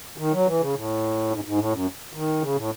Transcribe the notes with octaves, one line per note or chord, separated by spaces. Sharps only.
D#3
F#3
E3
C#3
A2
G#2
G#2
A2
F#2
D#3
C#3
A2